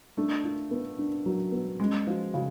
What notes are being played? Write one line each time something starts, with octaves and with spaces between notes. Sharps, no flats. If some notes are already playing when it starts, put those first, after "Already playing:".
A3 D4
F4
B3
D4
F#3
B3
G#3 C#4
F3 F#4
C#3 F#4